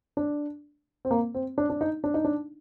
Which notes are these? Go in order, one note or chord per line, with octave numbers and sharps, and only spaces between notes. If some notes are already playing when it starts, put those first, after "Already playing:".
D4
C4
A#3
C4
D4
D4
D#4
D4
D#4
D4